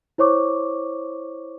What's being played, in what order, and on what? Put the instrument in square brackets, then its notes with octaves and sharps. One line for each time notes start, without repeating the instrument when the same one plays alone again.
[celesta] E4 C5 C#5 C#6 D6